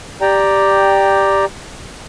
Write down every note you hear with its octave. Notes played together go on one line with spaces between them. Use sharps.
G4 D5 G5 A#5